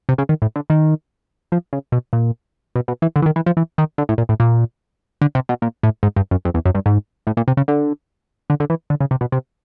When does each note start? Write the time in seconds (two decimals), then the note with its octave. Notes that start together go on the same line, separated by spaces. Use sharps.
0.09 C3
0.18 C#3
0.29 D#3
0.42 A2
0.56 D3
0.70 D#3
1.52 F3
1.73 C#3
1.92 B2
2.13 A#2
2.76 B2
2.88 B2
3.02 E3
3.16 D3
3.22 E3
3.26 D#3
3.36 E3
3.46 F3
3.57 E3
3.78 D#3
3.98 D3
4.09 A2
4.18 A#2
4.29 A2
4.40 A#2
5.21 D3
5.35 C3
5.49 B2
5.62 A#2
5.83 A2
6.03 G#2
6.16 G2
6.31 F#2
6.45 F2
6.54 E2
6.65 F#2
6.75 G2
6.86 G#2
7.27 A2
7.37 A#2
7.48 C3
7.57 C#3
7.68 D3
8.50 D3
8.60 D3
8.70 E3
8.90 D3
9.00 C#3
9.11 C3
9.21 B2
9.32 C3